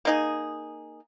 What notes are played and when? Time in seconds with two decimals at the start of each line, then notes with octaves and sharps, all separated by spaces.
0.05 A#3 D#4 G#4